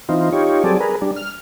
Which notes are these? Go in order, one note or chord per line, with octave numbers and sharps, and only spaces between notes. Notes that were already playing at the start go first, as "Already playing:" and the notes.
E3 C4 D#4 F4
D#4 F4 G4 C#5
F#3 G3 C4 G#4 A4 D5
G#4 A#4 B4
G3 D4
F6